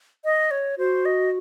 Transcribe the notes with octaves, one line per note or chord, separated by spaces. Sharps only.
D#5
C#5
F#4 C5
D#5